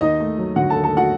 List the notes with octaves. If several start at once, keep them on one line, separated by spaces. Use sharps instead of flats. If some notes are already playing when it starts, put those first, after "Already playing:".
D#2 D#4 D#5
A3
F#3
D3 F#4 F#5
A4 A5
D#2
A4 A5
A3 F#4 F#5